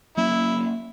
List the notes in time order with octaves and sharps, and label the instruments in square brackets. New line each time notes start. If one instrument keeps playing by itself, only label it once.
[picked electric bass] F#3 A#3 C#4 [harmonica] E4